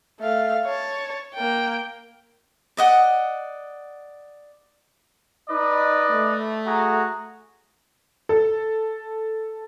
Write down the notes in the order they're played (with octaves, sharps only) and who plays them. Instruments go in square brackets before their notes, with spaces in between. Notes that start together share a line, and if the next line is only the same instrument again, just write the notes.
[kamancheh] A3 F5
C#5 A5
A#3 G5
[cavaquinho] D5 D#5 F#5
[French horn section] D#4 [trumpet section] B4 D5 D#5
[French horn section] A3
[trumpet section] F#4 G#4 A#5
[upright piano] A4